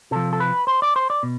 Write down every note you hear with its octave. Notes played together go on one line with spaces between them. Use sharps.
C3 F3 A4
A4
B4
C5
D5
C5
D5
B2